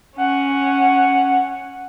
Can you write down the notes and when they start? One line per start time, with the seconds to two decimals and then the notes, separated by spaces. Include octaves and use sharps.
0.17 C#4 F#5